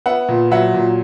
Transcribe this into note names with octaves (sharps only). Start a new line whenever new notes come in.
B3 E5 F#5
A#2
F#3 E5 F#5
A#2